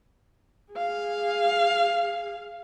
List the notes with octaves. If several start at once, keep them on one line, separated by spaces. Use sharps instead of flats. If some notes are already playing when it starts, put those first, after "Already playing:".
G#4 F5